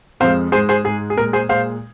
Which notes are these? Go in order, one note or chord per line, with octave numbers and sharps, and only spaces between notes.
F2 F3 G#3 C5 F5
G#2 G#3 G#4 C5
G#4 C5
G#2 G#3 G#4
G#4
A#2 G#3 A#4
G#4 C5
A#2 G#3 C5 F5